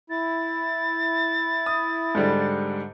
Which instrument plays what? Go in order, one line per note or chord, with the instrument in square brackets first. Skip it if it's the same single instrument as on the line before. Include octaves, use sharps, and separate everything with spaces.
[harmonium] E4 [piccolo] A6
[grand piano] D#6
G#2 D3 G3